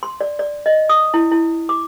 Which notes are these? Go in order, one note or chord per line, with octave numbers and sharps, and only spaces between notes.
C6
D5
D5
D#5
D#6
E4
E4
D6